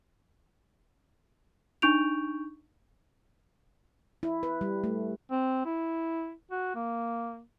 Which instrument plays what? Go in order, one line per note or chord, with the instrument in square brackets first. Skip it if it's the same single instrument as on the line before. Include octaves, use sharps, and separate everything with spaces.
[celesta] D4 D#4 C#6 G6 D7 F7
[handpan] E4
B4
G3
A3
[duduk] C4
E4
F#4
A#3